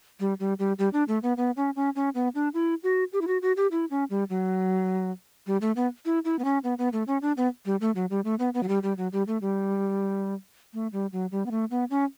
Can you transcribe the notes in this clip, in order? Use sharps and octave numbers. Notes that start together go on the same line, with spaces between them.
G3
G3
G3
G3
D4
A3
B3
B3
C#4
C#4
C#4
B3
D4
E4
F#4
G4
E4
F#4
F#4
G4
E4
C#4
G3
F#3
G3
A3
B3
E4
E4
B3
C#4
B3
B3
A3
C#4
D4
B3
G3
A3
F#3
G3
A3
B3
B3
F#3
G3
G3
F#3
G3
A3
G3
A3
G3
F#3
G3
B3
A3
B3
C#4